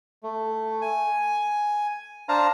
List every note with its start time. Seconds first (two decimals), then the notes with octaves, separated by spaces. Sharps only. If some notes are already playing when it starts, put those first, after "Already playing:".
0.23 A3
0.81 G#5
2.29 D4 C5 F5 A5 A#5